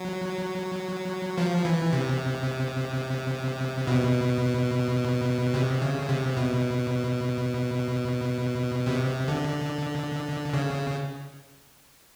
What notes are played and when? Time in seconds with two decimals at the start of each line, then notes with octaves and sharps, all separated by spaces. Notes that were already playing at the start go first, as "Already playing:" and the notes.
Already playing: F#3
1.38 F3
1.65 E3
1.93 C3
3.87 B2
5.54 C3
5.82 C#3
6.09 C3
6.37 B2
8.86 C3
9.28 D3
10.53 C#3